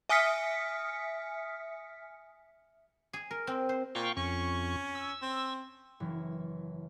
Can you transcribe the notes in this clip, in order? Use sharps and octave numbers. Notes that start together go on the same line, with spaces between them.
E5 G#5 D#6 F6 B6 C#7
G#4
A#4
C4
C5
A#2 F5 G5 C#6
F2 C#4 C#6
E6
C4
F#1 E3